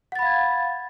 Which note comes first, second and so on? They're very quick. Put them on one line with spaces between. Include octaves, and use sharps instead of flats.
F#5 A6 B5 F5 G#6